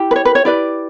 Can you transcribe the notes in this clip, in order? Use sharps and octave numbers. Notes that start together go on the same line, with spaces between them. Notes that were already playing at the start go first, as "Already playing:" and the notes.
Already playing: E4 G4
B4
C#5
B4
C#5
E4 G4 B4 D5